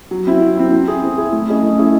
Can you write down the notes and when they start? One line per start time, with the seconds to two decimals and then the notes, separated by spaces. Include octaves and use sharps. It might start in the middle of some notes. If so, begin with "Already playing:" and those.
0.11 F#3
0.27 C4 E4
0.42 F#3
0.57 C4 E4
0.72 C4
0.88 E4 G#4
1.03 C4
1.18 E4 G#4
1.33 A3
1.48 C#4 E4 G#4 D#5
1.63 A3
1.78 C#4 E4 G#4 D#5